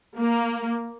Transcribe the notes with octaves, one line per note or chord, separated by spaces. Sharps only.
A#3